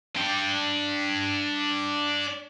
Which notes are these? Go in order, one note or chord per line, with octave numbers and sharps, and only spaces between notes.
D4 G5